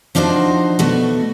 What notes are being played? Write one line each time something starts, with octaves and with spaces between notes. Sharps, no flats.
F3 D4 D#4 F#4 C5
B2 A3 F#4